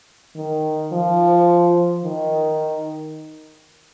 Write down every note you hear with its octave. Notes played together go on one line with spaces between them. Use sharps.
D#3
F3
D#3